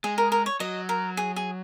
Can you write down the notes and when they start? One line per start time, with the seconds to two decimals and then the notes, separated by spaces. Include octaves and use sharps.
0.04 G#3 G#4
0.18 A#4
0.32 A#4
0.46 C#5
0.60 F#3 D#5
0.89 A#4
1.17 G#4
1.36 G#4